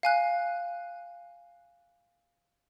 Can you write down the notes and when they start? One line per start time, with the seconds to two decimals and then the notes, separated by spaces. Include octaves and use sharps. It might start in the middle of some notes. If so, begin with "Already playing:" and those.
0.03 F5 G#5 F#6